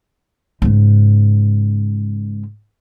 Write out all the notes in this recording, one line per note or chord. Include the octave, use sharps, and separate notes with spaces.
G#2 C#3